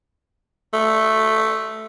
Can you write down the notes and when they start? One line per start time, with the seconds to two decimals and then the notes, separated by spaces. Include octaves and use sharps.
0.74 A3